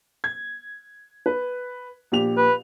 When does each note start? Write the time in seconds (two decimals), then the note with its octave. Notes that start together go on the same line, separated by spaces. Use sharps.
0.24 G#6
1.26 B4
2.12 A#1 G4 F7
2.37 B4